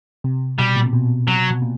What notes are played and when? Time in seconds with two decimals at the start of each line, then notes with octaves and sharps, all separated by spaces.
0.24 C3
0.59 B2 G3
0.76 A#2
0.86 C3
0.93 B2
1.27 C3 F#3
1.51 B2
1.62 A#2